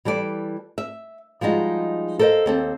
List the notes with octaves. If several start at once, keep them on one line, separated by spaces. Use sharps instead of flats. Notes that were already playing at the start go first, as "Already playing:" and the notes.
E3 G3 A4 D5
E5
F3 G3 G#3 D#4 F#4
A4 A#4 C5 D5 D#5 F5
D#2 C4 A4